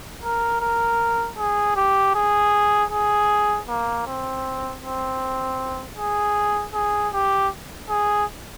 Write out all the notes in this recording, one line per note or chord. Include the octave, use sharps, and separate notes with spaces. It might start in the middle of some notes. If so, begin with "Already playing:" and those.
A#4
A#4
G#4
G4
G#4
G#4
A#3
C4
C4
G#4
G#4
G4
G#4